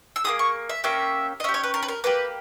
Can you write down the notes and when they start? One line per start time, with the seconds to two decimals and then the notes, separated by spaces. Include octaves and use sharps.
0.16 E6
0.24 A#3 E4 G#4 D#6
0.39 C#6
0.69 E5
0.84 A#3 C#4 G4 E5
1.40 D#5
1.44 C#4 E5
1.49 G4
1.54 C#5
1.63 B4
1.74 A#4
1.82 B4
1.88 A#4
2.04 A#3 E4 G4 B4